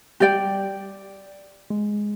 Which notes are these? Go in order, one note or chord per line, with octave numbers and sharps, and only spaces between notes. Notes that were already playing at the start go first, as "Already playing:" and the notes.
G3 G4 D5 G5
G#3